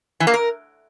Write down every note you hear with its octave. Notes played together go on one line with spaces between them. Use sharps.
E3
A#3
A#4